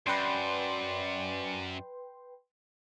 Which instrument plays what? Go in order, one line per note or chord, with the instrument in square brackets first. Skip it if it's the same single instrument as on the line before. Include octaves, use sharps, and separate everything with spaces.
[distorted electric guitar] F#2 [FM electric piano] B4 G5 C6 [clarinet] D5